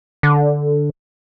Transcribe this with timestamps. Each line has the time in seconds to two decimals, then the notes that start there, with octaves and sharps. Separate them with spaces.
0.23 D3